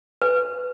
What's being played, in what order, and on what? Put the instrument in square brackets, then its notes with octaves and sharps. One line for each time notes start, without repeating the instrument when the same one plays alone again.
[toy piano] B4